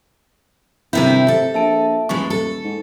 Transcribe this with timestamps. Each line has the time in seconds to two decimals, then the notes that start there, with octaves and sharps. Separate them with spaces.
0.93 G1 C3 D#3 C4 E4 E5 G6
1.28 C3 A4
1.54 A#1 E5 A5 D7
2.09 D#1 A#2 E3 G#3 C#6
2.30 A4
2.64 G#2